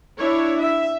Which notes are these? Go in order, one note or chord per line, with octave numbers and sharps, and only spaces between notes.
D4 E4 C#5
E5